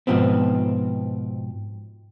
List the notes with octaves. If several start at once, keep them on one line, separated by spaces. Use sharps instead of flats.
G#2 B2 F3 B3 C4